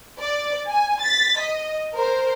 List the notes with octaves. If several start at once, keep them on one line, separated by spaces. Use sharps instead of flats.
D5
G#5
A6 B6
D#5
A#4 C5